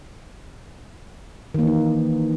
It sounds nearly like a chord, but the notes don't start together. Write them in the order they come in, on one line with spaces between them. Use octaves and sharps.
D#3 A#3 E3 D#4